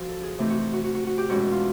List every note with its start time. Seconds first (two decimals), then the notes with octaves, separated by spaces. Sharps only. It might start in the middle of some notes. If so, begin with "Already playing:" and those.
Already playing: F3 F#4
0.09 A4
0.23 G#4
0.38 C3 E3 A3 C4 D#4
0.50 F#4
0.61 F#4
0.73 F#4
0.84 F#4
0.95 F#4
1.07 F#4
1.18 G4
1.29 E2 B2 G#3 C#4 F#4
1.52 F4